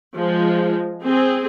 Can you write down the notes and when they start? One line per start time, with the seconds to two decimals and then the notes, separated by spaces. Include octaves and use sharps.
0.15 F3 G#3
1.02 C4 G#4